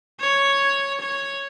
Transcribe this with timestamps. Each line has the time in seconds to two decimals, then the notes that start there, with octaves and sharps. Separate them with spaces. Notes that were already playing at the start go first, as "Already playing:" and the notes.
0.20 C#5
1.00 C#5